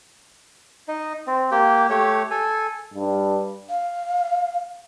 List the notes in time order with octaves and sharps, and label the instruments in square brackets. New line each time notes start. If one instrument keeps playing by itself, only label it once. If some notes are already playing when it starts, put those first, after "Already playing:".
[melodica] D#4 D#5
C4
A#3 G4 G5
A3 G4 C#5
A4 G#5
[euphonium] G2
[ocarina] F5